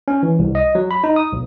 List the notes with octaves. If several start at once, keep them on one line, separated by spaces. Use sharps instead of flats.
C#4
E3
C2
D#5
F#3
B5
D#4
D#6
B1